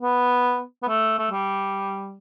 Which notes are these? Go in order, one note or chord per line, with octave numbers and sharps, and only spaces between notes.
B3
B3
A3
A3
G3